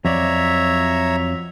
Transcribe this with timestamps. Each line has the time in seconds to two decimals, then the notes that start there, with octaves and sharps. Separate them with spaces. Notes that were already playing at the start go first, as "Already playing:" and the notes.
0.05 F2 F#3 C#5 D5 E5 A#5